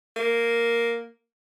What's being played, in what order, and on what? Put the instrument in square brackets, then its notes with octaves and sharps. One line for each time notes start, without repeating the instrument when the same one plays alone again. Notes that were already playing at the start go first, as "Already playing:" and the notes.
[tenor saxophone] A#3